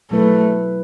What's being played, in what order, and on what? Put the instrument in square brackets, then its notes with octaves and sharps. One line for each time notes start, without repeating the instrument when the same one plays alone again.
[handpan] B2 F#3 B3 E4 B4 [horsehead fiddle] A3